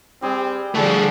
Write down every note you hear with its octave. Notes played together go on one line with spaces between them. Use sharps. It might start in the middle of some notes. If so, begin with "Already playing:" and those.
G3 C4 G#4
D3 F3 G3 A3 F#4 G#4 A4